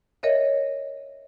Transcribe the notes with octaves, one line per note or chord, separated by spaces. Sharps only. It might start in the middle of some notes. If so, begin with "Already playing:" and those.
A#4 C#5 D#5 E5